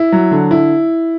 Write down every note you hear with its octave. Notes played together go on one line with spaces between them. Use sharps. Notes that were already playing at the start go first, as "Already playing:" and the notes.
Already playing: E4
F#3
D3
E4